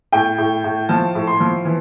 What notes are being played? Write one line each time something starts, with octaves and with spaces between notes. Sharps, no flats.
A2 G5
A2
A2
F3 A5
A2
C6
F3
E3